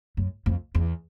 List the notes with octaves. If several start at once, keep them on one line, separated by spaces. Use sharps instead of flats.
F#2
F2
E2